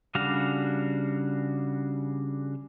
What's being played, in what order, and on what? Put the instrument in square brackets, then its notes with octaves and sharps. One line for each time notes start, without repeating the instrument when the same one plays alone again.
[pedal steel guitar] C#3 G3 D4 F#4 F5